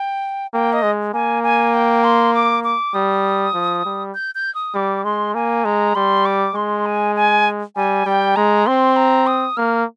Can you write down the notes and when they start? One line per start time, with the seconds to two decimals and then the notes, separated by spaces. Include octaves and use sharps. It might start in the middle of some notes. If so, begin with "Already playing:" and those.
Already playing: G5
0.53 A#3 G5
0.73 D#5
0.83 G#3
1.13 A#3 G#5
1.43 G#5
1.74 G5
2.04 C6
2.34 D6
2.64 D6
2.94 G3 D#6
3.54 F3
3.85 G3
4.14 G6
4.35 G6
4.55 D#6
4.75 G3 D6
5.04 G#3 C6
5.35 A#3 G#5
5.65 G#3 A#5
5.95 G3 C6
6.26 D6
6.55 G#3 C6
6.86 G#5
7.16 G#5
7.76 G3 G#5
8.06 G3 G5
8.36 G#3 A#5
8.66 C4 C6
8.96 A#5
9.27 D#6
9.57 A#3 F6